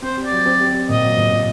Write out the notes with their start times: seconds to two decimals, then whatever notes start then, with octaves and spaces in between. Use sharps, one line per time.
0.02 C4 C5
0.17 G4
0.25 D5
0.31 F#3
0.46 C4
0.60 G4
0.74 G4
0.89 A#2 D#5
1.04 F#3
1.18 A#2
1.32 A#2